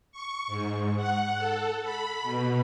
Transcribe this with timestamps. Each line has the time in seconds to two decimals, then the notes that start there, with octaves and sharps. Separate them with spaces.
0.12 C#6
0.47 G#2
0.96 F#5
1.38 A4
1.83 B5
2.23 B2